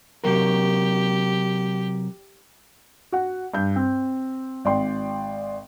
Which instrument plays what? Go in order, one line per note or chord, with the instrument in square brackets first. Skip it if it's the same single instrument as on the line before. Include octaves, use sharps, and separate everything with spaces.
[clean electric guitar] C3 F#3 A#4 [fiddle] G4
[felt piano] F#4 F#5
G2 G6
C4
G#1 D5 G5 C6